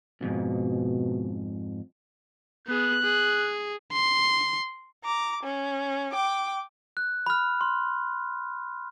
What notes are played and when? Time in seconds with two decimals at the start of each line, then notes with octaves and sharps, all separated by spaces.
0.21 C2 F2 G#2 B2
2.67 B3 G#4 F#6
3.03 G#4
3.93 C6
5.04 A#5 D6
5.43 C#4
6.12 G5 D6
6.97 F#6
7.26 B5 F6
7.61 C6